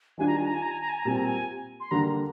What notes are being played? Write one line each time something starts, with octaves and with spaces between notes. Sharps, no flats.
D#3 G3 D4 F4 G#5
A#5
G#5
A#5
G#5
A#5
G#5
A#5
G#5
A#5
A#2 G3 C4 G#5
A#5
G#5
C6
D3 G3 A#3 D4 A#5